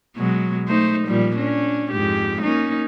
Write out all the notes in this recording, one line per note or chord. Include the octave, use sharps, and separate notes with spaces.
B2 F#3 G#3
A3 D#4 C5
A#2 F3 G3
C#4 D4
F2 G#2 G4
A#3 C#4 D#4